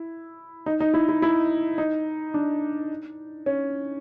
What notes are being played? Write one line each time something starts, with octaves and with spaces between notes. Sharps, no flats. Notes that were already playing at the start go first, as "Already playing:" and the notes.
Already playing: E4
D#4
D#4
E4
E4
E4
D#4
D4
C#4